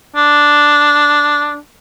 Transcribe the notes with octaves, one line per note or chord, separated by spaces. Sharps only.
D4